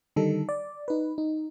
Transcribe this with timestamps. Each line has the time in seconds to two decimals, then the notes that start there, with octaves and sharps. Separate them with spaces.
0.16 D3 D#3 G3 D#4 A4
0.49 D5
0.88 D#4 B4
1.18 D#4